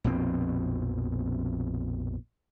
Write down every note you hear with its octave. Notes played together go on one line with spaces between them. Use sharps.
A#1 F2 B2 C4